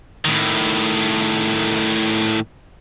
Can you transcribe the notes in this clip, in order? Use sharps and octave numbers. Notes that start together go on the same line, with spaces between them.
A2 D#3